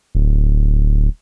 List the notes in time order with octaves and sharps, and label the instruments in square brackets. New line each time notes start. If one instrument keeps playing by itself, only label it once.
[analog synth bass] D1